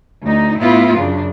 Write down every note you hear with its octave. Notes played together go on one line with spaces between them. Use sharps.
D2 D#4
A2 B3 E4 F4
F#2 C#3 D4